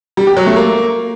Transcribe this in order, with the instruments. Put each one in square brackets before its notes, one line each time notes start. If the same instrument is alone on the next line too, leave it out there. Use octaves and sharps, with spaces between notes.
[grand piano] G3
G4
F#3
A3
A#3